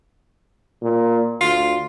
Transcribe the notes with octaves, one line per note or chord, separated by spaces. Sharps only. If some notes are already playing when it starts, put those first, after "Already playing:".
A#2
D2 F4